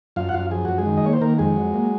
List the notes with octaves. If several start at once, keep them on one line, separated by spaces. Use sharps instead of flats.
F#2 F4 F5
F#5
F#2 F4 F5
F3 G#4
F#2 F#4
G#3 G#4
D#3
D#5
A#3 C#5
C5
D#3 A#3 A#4
F2 G#3 G#4
F#3
A#3